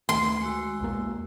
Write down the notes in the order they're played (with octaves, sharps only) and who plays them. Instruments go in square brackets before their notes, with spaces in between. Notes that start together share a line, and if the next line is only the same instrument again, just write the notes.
[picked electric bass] D2 D#3 A3 [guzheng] C6
[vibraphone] G#3 F#4 E6
[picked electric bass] B1 E2 A#3